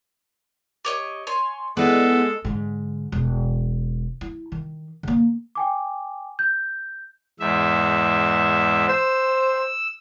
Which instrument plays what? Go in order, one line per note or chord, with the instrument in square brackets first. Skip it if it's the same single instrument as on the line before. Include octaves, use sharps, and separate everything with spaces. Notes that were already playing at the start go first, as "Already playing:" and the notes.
[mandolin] G4 C#5 D#5
C#5 G#5 C6
[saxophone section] G#3 [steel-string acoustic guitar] B3 E4 [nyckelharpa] A4 [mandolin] D5
[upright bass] G#2 D3
E1
E4
D#3
D3 A#3
[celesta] G5 G#5 D6
G6
[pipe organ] E2 G#2 E5
[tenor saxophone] C5 [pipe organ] E6